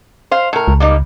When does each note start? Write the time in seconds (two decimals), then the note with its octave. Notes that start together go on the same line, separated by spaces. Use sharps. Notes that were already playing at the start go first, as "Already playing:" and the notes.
0.31 C5 F5
0.53 A2 A#4
0.68 C#2
0.80 G3 A#3 D#4